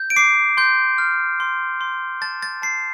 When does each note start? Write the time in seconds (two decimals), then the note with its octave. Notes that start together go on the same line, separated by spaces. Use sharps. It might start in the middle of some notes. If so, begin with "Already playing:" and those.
Already playing: G6
0.10 D7
0.16 D6 C7
0.57 C6 G6
0.98 F6
1.40 C6
1.81 C6
2.22 A5 A6
2.42 A6
2.62 A5 C7